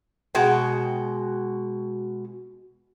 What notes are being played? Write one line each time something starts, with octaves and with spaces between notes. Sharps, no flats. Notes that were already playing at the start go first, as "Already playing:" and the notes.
B2 G#3 F#4 G5